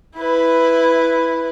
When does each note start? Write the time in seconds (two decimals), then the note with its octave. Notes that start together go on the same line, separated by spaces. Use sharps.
0.17 E4 B4